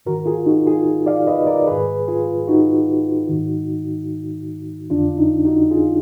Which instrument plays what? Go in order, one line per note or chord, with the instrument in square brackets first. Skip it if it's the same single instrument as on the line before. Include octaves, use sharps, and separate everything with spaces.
[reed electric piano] G#2 D#3 F#4 A#4
F4 G#4
D#4 F#4
F4 G#4
D5 F5
B4 D#5
A#4 D5
G#2 D#3 G#4 B4
F4 G#4
D#4 F#4
G#2 D#3
F2 D3 D4 F4
D#4
D#4 F#4
F4 G#4